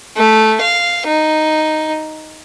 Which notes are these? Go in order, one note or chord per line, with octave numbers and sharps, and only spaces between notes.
A3
F5
D#4